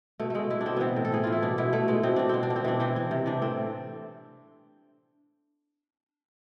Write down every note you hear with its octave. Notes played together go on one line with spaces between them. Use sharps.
B2 A3
B2 G#3 A3
B2 E4
D4
B2 C4
E3 B3 C4
A2
A4
E3 G#4
E3 F4
E4
B2 D4
B2 E4
B2 A3
B2 G#3
B2 C4
B2 D4
B2 C4
D4
B2
C4
E3 D4
E3 C4
E3
C3
E3 D4
A2 C4